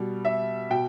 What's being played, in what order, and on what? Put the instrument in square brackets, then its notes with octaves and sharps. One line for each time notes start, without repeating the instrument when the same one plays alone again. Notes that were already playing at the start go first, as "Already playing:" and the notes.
Already playing: [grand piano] B2 G3
E5
B2 G5